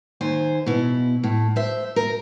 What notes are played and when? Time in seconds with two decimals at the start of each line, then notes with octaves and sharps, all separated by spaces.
0.21 D#2 C5 G#5
0.66 B2 E4
1.23 A2
1.56 C5 E5
1.96 A#4